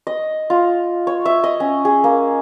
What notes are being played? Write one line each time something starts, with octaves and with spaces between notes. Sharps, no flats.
D#5
F4
C#5
E5
D#5
C#4
G#4
A#3